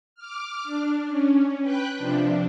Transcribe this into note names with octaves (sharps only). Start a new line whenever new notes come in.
D6 F6
D4
C#4
B4 G5 F#6
C3 F3 D4